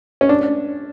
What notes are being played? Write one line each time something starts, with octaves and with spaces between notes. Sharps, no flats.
C#4
D4